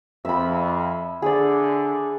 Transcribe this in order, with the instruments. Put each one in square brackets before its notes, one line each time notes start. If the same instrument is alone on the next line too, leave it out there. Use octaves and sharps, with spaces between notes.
[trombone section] F2 [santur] E5 B5
[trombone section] D3 [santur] G#4 D5